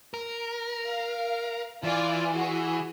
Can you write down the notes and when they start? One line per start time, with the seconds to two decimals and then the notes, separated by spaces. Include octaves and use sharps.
0.14 A#4
0.86 F5
1.83 E3 F4 D5 G#5
2.33 F#4 G#4